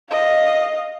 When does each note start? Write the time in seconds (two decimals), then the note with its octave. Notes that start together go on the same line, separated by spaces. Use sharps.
0.11 D#5 F5